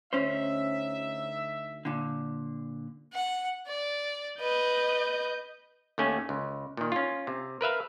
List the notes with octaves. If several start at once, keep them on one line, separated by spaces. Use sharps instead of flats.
D2 C#4 D#4 C5 E5
A#2 D3
F#5
D5
B4 D#5 G6
D#2 A3 C#4 G#5
C#2
A#2 D#3
C#4 F4
C3
A#4 B4 E5 F5